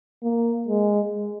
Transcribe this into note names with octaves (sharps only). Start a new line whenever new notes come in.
A#3
G#3